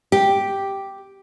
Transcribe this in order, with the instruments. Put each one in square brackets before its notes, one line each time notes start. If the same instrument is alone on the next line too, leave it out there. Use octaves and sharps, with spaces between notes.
[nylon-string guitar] G4